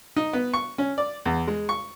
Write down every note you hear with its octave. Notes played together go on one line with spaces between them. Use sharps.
D#4
B3
C#6
C#4
D5
E2
G#3
C#6